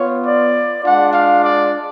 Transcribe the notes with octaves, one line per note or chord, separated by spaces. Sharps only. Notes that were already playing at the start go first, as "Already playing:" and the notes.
Already playing: B3 F4 C#5
D5
G#3 D4 F4 F#5
F5
D5